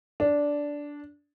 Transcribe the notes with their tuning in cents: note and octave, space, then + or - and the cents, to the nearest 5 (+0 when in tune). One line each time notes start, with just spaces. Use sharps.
D4 -10